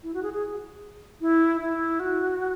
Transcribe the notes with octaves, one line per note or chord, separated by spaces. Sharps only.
E4
F#4
G#4
G#4
E4
E4
F#4